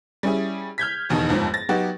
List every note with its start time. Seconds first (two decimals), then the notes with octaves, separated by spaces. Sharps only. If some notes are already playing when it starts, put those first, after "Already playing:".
0.23 G3 C#4 E4 G#4
0.78 F6 G6 G#6 B6
1.09 F1 E2 B2 D#3 D#4
1.29 G1 F2 G#2 F3
1.54 A6 A#6
1.69 F#3 B3 D#4 F#4 G4